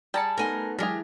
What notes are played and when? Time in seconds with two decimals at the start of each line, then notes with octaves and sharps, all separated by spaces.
0.14 G3 G#4 D5 G5 A5 A#5 C#7
0.38 A3 B3 D#4 A#4 G#5 C6
0.79 E3 F#3 G#3 D4 G4 G#4 A#4